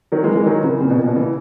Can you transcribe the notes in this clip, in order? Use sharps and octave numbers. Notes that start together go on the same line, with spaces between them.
D#3 F#3
E3 G#3
E3 G#3
D#3 F#3
C#3 E3
A#2 C#3
B2
A#2
B2
C#3 E3